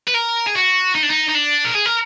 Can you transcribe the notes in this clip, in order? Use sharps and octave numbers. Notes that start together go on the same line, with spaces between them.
B4
A#4
G#4
F#4
D#4
D4
D#4
D#4
D4
A#4
G#4
A#4